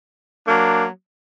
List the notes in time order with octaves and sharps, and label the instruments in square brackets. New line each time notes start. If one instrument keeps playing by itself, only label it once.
[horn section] F#3 A#3 D4